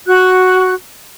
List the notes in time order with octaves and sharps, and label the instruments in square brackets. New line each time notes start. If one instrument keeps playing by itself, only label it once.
[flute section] F#4 F#6